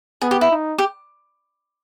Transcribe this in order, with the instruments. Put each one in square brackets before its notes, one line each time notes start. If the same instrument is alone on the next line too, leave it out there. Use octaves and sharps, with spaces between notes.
[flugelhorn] B3 [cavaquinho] G#4
[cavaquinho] G4
E4
[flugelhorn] D#4
[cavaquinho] G4